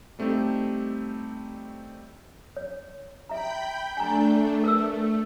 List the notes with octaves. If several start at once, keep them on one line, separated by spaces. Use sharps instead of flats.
G3 A3 C4 D#4 G4 A4
C#5
E5 G5 A#5 B5 G6
A3 D4 G#5 A#5
A3 A#4 B4 E6